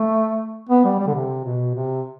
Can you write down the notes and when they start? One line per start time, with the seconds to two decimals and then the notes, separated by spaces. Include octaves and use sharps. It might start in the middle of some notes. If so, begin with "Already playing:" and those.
Already playing: A3
0.69 B3
0.85 G3
1.00 G3
1.07 D3
1.15 C3
1.45 B2
1.75 C3